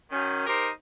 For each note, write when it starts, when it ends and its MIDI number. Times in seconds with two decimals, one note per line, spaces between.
0.11 0.45 42
0.11 0.45 51
0.11 0.45 61
0.46 0.68 63
0.46 0.68 67
0.46 0.68 70
0.46 0.68 72